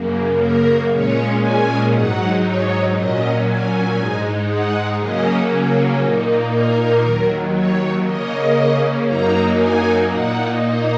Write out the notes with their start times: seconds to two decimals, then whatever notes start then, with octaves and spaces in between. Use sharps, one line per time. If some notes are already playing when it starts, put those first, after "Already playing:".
Already playing: F#2 C#3 A#3
0.40 A#4
0.91 A#2 G#3 C#4 C#5
1.41 G#5
1.92 G#2 F#3 D#4 F#5
2.43 C#5
2.94 A#2 F#3 C#4 D#5
3.45 G#5
3.97 G#2 G#3 D#4
4.48 F#5
4.98 C#3 F#3 A#3 C#4 D#5
6.00 A#2 A#3 D#4
6.52 A#4
7.02 D#2 D#3 F#3
7.54 C#5
8.05 C#3 A#3 C#4 D#5
9.06 F#2 F#3 A#3 D#4 A#5
9.57 G#5
10.08 A#2 A#3 D#4 F#5
10.59 D#5